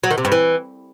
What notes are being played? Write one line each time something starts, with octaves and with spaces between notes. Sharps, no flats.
F#3
D#3
C3
G2
E3